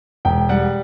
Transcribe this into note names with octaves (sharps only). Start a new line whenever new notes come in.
E1 G5
G3 F#5